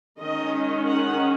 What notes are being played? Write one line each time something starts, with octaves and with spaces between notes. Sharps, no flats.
D#3 G#3 C#4 D#5
F#5